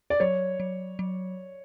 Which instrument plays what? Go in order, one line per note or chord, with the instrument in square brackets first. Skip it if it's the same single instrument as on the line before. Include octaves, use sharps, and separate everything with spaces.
[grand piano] D5
[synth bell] F#3 [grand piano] C#5
[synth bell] F#3
F#3